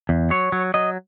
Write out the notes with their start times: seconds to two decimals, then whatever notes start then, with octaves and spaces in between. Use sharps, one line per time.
0.09 E2
0.30 F#3 C#5
0.52 F#3
0.74 F#3 D#5